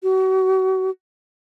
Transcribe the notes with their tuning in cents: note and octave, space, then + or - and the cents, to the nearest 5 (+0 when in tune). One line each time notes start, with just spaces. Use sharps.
F#4 +35